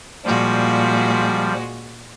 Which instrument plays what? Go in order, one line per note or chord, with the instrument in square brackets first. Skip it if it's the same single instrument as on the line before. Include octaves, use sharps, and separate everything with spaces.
[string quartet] A#2 G#3 F#4 [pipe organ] F3 G3